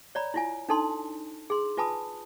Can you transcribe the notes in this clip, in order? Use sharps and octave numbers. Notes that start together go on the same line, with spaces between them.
C#5 D5 A#5 B5
E4 F4 G#5
D4 D#4 A4 A5 C6
G#4 C6
F4 B4 G#5 A5 B5 D#6